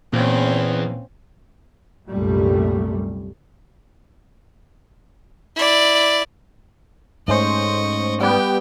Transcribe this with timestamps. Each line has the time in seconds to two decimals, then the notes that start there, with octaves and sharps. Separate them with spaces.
0.13 E2 A#2 C4 C#4
2.10 C2 F#2 A#2 G3 A3
5.56 E4 D5
7.28 G#2 A3 C#4 C5 D#5 C#6
8.20 G3 B3 G4 G5